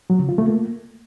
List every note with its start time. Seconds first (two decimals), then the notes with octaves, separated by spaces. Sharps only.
0.10 F#3
0.19 C#3
0.29 F4
0.38 A3
0.48 A#3